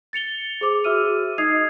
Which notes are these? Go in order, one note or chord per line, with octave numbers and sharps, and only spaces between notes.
A6 C#7 F7 G7
G#4 C5 D6 F7
F#4 G#4 E5 E6 F6 D#7
D#4 D#5 D#6 G#6 C7 F7